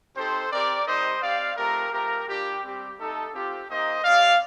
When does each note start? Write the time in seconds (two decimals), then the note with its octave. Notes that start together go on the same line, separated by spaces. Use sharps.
0.17 C4 D#4 G4 A4 C5
0.52 C4 G4 A#4 D5
0.87 G3 C4 D#4 G4 C5 D#5
1.22 C4 G4 D5 F5
1.57 A3 C4 F4 G4 A#4
1.92 A3 C4 F4 G4 A#4
2.27 G3 D4 F4 G4
2.64 G3 C4 G4
2.98 A3 D#4 G4 A4
3.33 C4 F4 G4
3.69 A#3 D#4 G4 C5 D#5
4.04 C4 G4 D5 F5